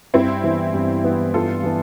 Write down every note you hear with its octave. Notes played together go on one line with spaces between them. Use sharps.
G2 C4 E4
E3 B3
G2
E3 B3
G2 F4 A4
E3 B3